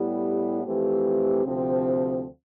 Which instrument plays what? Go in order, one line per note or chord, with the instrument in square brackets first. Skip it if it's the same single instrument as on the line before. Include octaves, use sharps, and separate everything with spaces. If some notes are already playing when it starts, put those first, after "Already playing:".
Already playing: [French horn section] A2 G3 B3 E4 G4
F2 E3 A3 C4 G4
D2 C3 F3 C4